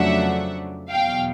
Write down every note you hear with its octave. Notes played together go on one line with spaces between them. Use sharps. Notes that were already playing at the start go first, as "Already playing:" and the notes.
Already playing: F2 C#3 F#3 A3 D4 E5 F#5
E2 B2 F#3 F5 G5